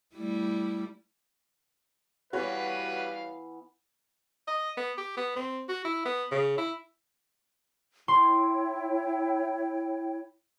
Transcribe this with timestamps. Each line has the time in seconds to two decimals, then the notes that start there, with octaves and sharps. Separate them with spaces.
0.15 G3 A3 E4
2.33 E3 G3 B3 F#4 B4 C#5 F5
4.47 D#5
4.77 B3
4.97 G4
5.17 B3
5.36 C4
5.68 F#4
5.85 E4
6.05 B3
6.31 C#3
6.58 E4
8.08 E4 C#5 G5 C6